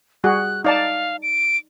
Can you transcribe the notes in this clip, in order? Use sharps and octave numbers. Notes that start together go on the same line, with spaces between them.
G3 F#4 G#4 F#6
D#4 D5 F5 A5
D7